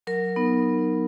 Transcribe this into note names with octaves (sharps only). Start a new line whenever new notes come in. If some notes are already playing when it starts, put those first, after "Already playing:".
F#3 A#4
B3 D#4